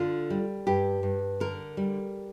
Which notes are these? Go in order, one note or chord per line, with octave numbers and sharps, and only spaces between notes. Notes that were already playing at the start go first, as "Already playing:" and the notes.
Already playing: D3 F4
G3
G2 G4
G2
D3 A#4
G3